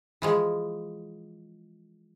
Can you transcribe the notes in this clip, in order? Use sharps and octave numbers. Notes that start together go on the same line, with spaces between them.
E3 F3 G#3